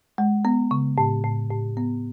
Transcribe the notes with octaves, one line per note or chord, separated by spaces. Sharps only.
G#3
B3
C#3
A2
A2
A2
B3